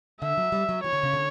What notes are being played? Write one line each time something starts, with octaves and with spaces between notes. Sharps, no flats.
D3 E5
F#3
G3
F#3
E3 C#5
D3
C#3
D3